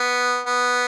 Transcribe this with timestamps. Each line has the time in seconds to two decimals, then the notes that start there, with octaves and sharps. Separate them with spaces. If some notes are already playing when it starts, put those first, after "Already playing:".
Already playing: B3
0.46 B3